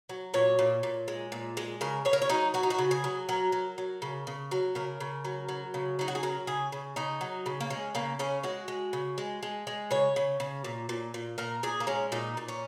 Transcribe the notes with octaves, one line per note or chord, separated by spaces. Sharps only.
F#3
A#2 C#5
A#2
A#2
G#3
A#2
G#3
C#3 A#4
C#3 C#5
A#4
C#5
F#3 D#4
F#3 F#4
D#4
F#4
C#3
G#4
F#3
F#3 A#4
F#3
F#3
C#3
C#3
F#3
C#3 A#4
C#3
F#3
F#3
C#3
F#3 D#4
F#4
G#4
F#3 A#4
C#3 G#4
C#3
C#3 D#4
F#3
C#3
A#3
G#3 C#4
C#3 A#3
C#3 C#4
G#3 F#4
G#3
C#3
G#3
G#3
G#3
C#3 C#5
C#3
C#3
A#2
A#2
A#2
A#2 A#4
A#2 G#4
A#3
G#3 C#4
A#2 D#4
A#2
C#4